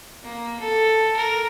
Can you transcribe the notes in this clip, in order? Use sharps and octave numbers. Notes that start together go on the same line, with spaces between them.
A#3
A4
A#4